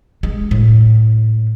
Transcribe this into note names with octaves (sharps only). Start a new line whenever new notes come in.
G#3
A2